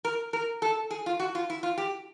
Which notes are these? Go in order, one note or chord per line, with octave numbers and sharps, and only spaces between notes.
A#4
A#4
A4
G#4
F4
F#4
F4
E4
F4
G4